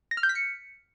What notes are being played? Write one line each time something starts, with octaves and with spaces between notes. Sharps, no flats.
A#6
F6
G6
B6
C#7